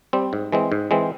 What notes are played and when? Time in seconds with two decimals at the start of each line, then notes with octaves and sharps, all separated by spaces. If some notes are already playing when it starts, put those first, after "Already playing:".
0.13 G3 C4
0.33 G#2
0.52 E3 G#3 C4
0.72 G#2
0.91 E3 G#3 C4